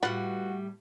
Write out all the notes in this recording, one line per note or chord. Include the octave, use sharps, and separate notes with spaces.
A2 G3 F4 F#4 B4 F#5